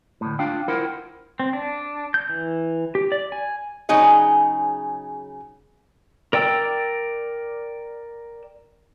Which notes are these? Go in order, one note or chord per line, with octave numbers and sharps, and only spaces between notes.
D2 A2
D4 F4 F5 G5
E4 F4 A#4 C5 F#5 G5
C4
D4
G6
E3
G4
D5
G#5
C#3 F#3 D#4 G#4 D#5
A#4 D5 G5 E6